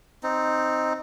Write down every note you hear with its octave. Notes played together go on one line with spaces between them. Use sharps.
C4 D#4